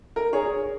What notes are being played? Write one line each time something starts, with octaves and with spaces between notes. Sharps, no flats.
A#4
G#4 C#5